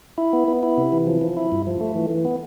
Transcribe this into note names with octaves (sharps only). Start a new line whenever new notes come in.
E4
B3
B3
E4
C3
E3
F3
F3
E4
G2
F3
A3
E3
E3
B3